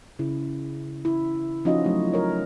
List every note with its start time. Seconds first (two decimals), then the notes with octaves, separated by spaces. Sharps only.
0.19 C#3 E4
1.05 E4
1.65 F3 C#4 D#4 F4 F#4 D#5
1.84 F#3 A3
2.13 A#4 C#5